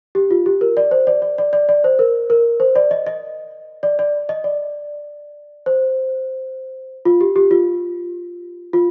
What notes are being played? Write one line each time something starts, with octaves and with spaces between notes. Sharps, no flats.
G4
F4
G4
A#4
D5
C5
D5
D5
D5
D5
D5
C5
A#4
A#4
C5
D5
D#5
D#5
D5
D5
D#5
D5
C5
F4
G4
G4
F4
F4